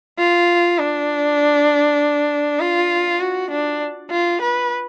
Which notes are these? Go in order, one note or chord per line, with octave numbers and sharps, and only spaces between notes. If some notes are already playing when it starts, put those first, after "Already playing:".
F4
D4
F4
F#4
D4
F4
B4